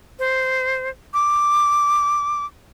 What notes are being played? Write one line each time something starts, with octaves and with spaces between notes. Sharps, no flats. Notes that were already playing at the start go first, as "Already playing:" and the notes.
C5
D6